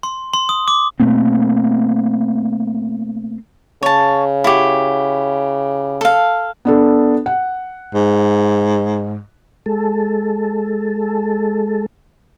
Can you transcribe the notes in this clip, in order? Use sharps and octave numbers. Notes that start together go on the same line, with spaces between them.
C6
C6
D#6
D6
B2 A3 A#3 C4
C#3 C#5 A5
E4 F#4 G4
A4 F5
B3 D4 A4
F#5
G#2
G#3 A4